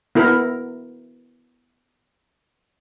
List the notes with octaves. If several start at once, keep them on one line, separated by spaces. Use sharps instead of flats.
B3 E4 A#4